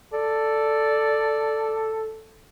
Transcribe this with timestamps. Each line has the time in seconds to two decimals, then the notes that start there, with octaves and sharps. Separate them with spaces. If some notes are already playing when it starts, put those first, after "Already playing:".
0.13 A4 D5